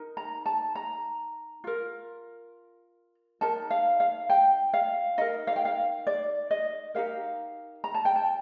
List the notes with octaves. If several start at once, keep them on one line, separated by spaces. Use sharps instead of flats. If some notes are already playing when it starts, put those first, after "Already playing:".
Already playing: D#4 A#4
A#5
A5
A#5
F4 A#4
D#4 A#4 A5
F5
F5
G5
F5
D#4 A#4 D#5
F5
G5
F5
D5
D#5
D#4 G4 A#4 F5
A#5
A5
G5
A5